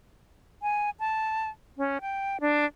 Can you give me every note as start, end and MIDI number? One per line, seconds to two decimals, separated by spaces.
0.62 0.90 80
1.00 1.49 81
1.78 1.98 61
2.01 2.37 79
2.41 2.65 62